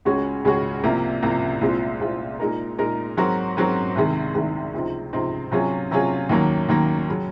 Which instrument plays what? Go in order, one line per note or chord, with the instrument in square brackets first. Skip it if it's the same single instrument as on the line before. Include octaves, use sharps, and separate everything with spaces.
[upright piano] C#2 C#3 G#3 C#4 F#4
C#2 C#3 G#3 C#4 F#4
C2 C3 F3 A#3
C2 C3 F3 A#3
C2 A#2 G#3 C4 F4
C2 A#2 G#3 C4 F4
A#2 G#3 D#4 A#4
A#2 G#3 D#4 A#4
G#2 F#3 C4 F#4 A#4
G#2 F#3 C4 F#4 A#4
C2 C3 D#3 G#3
C2 C3 D#3 G#3
C#2 C3 F3 C4 D#4
C#2 C3 F3 C4 D#4
C3 F#3 C#4 F4 G#4
C3 F#3 C#4 F4 G#4
D#2 D#3 F#3 A#3
D#2 D#3 F#3 A#3
C#3 F#3